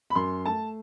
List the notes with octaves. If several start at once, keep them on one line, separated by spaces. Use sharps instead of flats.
B5
F#2 C6
A3 A5